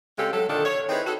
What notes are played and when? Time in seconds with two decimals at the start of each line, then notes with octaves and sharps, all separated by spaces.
0.18 C#3 G#3 C4 G4 A4
0.32 F#3 A4
0.49 A#2 D3 D#3 A4 D5
0.65 C#5
0.90 C4 D#4 E4 G#4 B4
1.06 F#4 A4